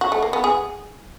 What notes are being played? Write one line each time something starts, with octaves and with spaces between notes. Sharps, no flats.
F#4
A3
A#3
B3
G#4